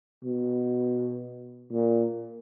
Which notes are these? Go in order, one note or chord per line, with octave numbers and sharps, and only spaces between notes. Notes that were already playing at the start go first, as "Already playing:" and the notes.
B2
A#2